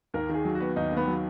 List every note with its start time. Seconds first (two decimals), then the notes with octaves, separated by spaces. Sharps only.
0.14 D#2 A#4
0.29 D#3 G#4
0.45 F#3
0.55 F#4
0.60 B3
0.76 D#2 D#4
0.92 D#3
0.97 B3
1.08 F#3